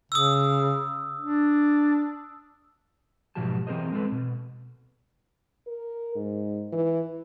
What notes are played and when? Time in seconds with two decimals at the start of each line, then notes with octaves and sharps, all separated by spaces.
0.12 C#3 D#6 E6
1.20 D4
3.35 G#2 B2 F3 F#3 G4 A5
3.67 E3 C4 G#4 A#4 C5 D#5
3.92 G#3 A3 C4 D#4 A4 B4
4.12 B2
5.67 A#4
6.15 G#2
6.72 E3